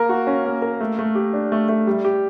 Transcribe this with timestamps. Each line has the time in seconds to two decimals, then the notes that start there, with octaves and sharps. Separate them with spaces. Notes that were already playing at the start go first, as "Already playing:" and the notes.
Already playing: A#3 A#4
0.09 F#4
0.27 C#4
0.45 A#3
0.62 A#4
0.80 A3
0.99 A3
1.15 G4
1.34 D4
1.52 A3
1.69 A3
1.87 G3
2.05 G4